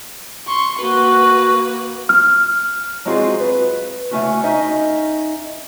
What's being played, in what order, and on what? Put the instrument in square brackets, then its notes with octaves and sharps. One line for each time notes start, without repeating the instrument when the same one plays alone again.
[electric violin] C6 C#6
[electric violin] A#3 B4 [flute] F#4
[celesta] F6
[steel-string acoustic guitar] F#3 G#3 C4 F4 F#4 G#4
B4
C#3 A3 C#4 F#4
C#4 D#4 D#5 E5